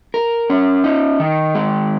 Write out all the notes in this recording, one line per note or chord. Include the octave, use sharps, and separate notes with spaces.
A#4
C#4
D#4
D#3
G#3